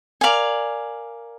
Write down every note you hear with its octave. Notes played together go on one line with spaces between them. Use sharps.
A#4 D5 F5 G#5